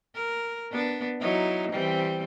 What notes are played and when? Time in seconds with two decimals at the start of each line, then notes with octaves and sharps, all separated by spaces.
0.15 A#4
0.72 B3 D4
1.20 F#3 D#4 E4
1.72 E3 G3 C4